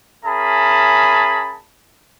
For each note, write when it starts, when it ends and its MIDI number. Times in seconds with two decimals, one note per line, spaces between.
0.25 1.59 61
0.25 1.59 68
0.25 1.59 70
0.25 1.59 76
0.25 1.59 81
0.25 1.59 83